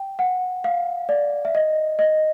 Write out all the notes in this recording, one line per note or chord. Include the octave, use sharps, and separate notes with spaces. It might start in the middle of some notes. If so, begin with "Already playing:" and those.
Already playing: G5
F#5
F5
D5
E5
D#5
D#5